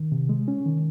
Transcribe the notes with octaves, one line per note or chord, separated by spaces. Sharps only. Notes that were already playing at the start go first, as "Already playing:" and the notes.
Already playing: D#3
C3
G#3
C#4
D#3